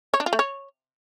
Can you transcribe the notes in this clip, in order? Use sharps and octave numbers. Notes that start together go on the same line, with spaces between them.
C#5
D4
F4
A3
C#5